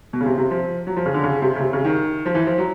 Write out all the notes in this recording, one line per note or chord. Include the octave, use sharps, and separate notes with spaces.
B2
C#3
C3
C3
F3
F#3
F3
C#3
D3
C#3
C3
C#3
C3
C#3
D#3
F3
E3
F3
F#3